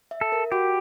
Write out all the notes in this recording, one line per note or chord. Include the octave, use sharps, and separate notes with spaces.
E5
A4
A#4
F#4 G4